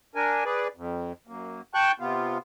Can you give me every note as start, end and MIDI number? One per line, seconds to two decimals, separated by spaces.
0.15 0.44 62
0.15 0.44 70
0.15 0.44 80
0.45 0.68 68
0.45 0.68 71
0.45 0.68 74
0.76 1.12 41
1.27 1.61 42
1.27 1.61 58
1.74 1.92 79
1.74 1.92 81
1.74 1.92 85
1.74 1.92 90
1.74 1.92 91
2.00 2.38 48
2.00 2.38 59
2.00 2.38 65